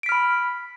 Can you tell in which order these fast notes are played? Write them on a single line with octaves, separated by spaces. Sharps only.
D7 B6 F6 B5